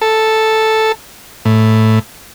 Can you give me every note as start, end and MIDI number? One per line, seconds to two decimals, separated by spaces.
0.02 0.92 69
1.45 1.99 45